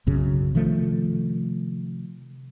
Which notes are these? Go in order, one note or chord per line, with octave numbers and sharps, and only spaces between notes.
B1 F#2 C#3
C3 D#3 F3 A3